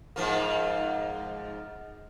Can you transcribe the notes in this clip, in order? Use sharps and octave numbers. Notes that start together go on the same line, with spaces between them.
G#2 F3 A#3